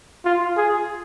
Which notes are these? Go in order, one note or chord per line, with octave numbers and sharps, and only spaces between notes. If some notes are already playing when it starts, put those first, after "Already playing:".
F4
G#4